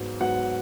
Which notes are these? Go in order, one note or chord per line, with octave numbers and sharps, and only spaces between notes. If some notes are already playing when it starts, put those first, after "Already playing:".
Already playing: G#2 F#3 B3
G#2 F#3 B3 F#5